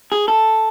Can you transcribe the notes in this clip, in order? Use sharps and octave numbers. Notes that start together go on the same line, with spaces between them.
G#4
A4